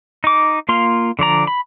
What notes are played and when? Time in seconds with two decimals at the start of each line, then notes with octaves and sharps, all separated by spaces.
0.24 D#4 D6
0.69 A#3 F4 F5 C6
1.19 D3 F3 D5 A#5
1.47 B5